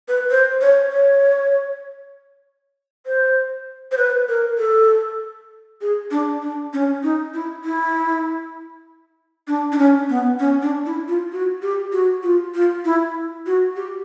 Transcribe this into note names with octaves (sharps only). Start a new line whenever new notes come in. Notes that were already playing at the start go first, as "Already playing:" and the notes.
B4
C5
C#5
C#5
C5
C5
B4
A#4
A4
G#4
D4
D4
C#4
D#4
E4
E4
D4
D4
C#4
B3
C#4
D4
E4
F4
F#4
G4
F#4
F4
F4
E4
F#4
G4